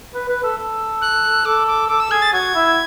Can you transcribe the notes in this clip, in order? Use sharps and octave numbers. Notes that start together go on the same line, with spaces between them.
B4
B4
A4
A4
F#6
A4 D6
D6
A4 D6
E6
G#4 G#6
A6
F#4 G#6
E4